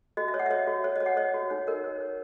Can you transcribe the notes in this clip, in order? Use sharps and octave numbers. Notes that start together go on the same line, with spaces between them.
F#4 D#5
E5
C#5
F#5
E5
C#5 D#5
F#4
C#5
C#5 D#5
F#5
C#5 D#5
F#4
D#4 C#5
A#4 D#5
C#5
C#5